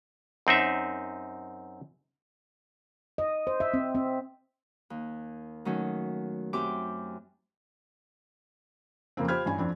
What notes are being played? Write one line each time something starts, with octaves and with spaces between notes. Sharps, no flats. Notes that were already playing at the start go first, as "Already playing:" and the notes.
F#2 C4 D#4 E5
D#5
C5
E5
C4
C4
D#2
D#3 F#3 A3 C#4
F#2 C4 G4 E5 D6 G6
F2 C#3 A#3 C4
F4 G4 C5 B5 F6 G#6
A1 G2 G#5
F2 C4 D4